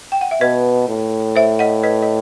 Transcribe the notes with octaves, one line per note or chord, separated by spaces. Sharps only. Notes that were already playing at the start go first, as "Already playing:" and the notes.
G5
F#5
E5
B2 B4 D#5
A2
C5 E5
D#5 F#5
B4 D#5
D#5